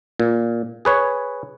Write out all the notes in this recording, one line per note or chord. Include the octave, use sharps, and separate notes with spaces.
A#2
G#4 B4 C#5